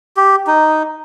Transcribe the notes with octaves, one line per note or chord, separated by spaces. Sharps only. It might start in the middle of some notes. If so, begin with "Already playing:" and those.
G4
D#4